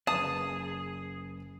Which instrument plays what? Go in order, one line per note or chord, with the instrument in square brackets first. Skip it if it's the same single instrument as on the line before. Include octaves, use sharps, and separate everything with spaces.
[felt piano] F#1 B4 [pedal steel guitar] G#4 [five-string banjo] A5 [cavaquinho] D#6